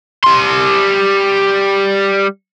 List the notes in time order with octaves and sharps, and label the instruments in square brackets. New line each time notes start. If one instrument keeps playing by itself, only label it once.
[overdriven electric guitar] G3 C6